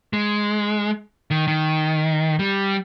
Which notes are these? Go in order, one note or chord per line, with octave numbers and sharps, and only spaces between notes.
G#3
D#3
D#3
G3